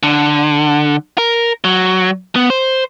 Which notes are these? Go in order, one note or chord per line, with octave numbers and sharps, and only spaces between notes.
D3
A#4
F#3
B3
C5